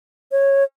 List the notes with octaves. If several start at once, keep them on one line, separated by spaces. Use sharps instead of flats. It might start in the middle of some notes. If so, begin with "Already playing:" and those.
C#5